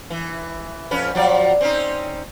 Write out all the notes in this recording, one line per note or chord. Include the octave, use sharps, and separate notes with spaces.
E3
F2 C#4 B4
F3 F#3 D5
C4 C#4 D#4